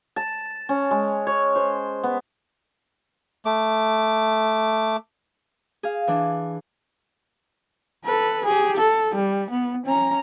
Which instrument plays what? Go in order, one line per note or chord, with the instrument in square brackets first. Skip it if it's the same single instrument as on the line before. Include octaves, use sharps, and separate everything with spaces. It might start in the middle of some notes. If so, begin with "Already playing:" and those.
[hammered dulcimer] A5
C#4
G#3
C#5
C5
B3
[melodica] A3 D6
[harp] G#4 F5
E3 D4
[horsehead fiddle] A4 B4
G4 G#4
A4
G3
B3
C#4 A#5